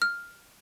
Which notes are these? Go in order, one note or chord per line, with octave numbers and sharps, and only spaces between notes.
F6